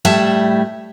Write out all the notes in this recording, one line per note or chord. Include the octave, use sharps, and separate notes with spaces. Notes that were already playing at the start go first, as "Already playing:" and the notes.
A2 G3 E5 A5